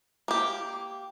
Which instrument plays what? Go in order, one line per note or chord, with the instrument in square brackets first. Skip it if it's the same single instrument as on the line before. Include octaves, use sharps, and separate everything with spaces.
[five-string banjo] A#3 G4